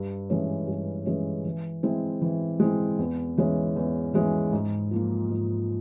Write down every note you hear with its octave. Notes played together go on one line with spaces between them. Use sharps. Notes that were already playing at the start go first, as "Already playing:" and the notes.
Already playing: G2
E3 G#3 C#4
G2
E3 G#3 C#4
E3
G#3 C4 E4
E3
G#3 C4 E4
E2
E3 G#3 C#4
E2
E3 G#3 C#4
G#2
F3 A#3 F4
G#2